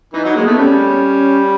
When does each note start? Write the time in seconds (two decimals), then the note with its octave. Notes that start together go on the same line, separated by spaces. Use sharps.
0.14 E3 D#4
0.25 F#3 D#4
0.36 G#3 A#3
0.47 A3 B3
0.58 G3 C#4